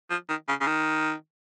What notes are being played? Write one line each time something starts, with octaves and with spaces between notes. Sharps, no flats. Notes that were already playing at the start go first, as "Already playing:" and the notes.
F3
D#3
C#3
C#3
D#3